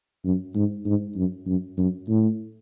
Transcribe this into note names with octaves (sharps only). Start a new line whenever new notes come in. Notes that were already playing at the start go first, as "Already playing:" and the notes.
F#2
G#2
G#2
F#2
F#2
F#2
A2